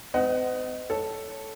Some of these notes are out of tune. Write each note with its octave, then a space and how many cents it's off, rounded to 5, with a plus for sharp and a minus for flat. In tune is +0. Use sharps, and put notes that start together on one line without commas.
C4 -45 D#5 +0 F#5 +15
A4 +0 C#5 +0